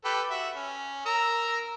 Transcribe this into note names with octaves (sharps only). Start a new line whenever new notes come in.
G4 A4 B4
F#4 E5
C#4
A#4 A#5 E6